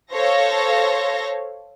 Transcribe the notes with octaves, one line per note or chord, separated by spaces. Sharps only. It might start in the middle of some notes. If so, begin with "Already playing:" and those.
A4 C5 C#5 F5 A#6